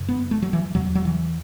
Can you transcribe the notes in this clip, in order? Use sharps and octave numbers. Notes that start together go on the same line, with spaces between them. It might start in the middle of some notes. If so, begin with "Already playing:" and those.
Already playing: F#2 C#3
B3
A3
F#3
E3
E2 C#3 F#3
F#3
E3